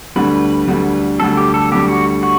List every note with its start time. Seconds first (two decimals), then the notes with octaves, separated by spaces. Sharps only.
0.16 D2 D3 G3 B4
0.68 D2 D3 G3
1.20 D2 D3 G3 A4
1.37 G4
1.54 A4
1.72 D2 D3 G3 G4
1.88 F#4
2.23 F#4